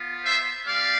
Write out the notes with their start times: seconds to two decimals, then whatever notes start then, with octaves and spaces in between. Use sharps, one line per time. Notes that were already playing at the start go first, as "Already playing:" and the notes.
Already playing: B3 F4
0.23 C5 E5
0.66 G3 C4 G4 D5 F5